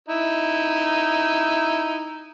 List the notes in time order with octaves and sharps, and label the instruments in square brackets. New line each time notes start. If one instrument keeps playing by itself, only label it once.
[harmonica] D#4 E4